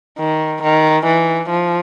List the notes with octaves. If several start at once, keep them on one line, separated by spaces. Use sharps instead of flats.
D#3
D#3
E3
F3